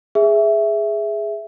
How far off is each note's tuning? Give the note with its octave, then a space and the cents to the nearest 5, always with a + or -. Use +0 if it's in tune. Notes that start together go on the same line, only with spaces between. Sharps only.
G#4 +0 E5 +0